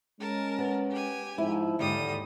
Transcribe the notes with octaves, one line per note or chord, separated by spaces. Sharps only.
G#3 C#4 A#4 A5
B3
G4 G#5
G#2 F3 E4
D#2 G#2 D3 G3 D#6